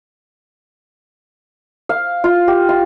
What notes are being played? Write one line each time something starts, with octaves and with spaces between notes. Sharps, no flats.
F5
F4
G4
F4